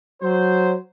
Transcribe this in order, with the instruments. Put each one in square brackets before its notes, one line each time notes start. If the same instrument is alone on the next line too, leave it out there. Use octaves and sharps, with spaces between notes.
[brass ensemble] F#3 C5